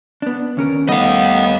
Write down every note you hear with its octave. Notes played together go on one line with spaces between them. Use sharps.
B3 D4
D#2 C#4 A#4
G3 A3 B3 D#4 D#5 F5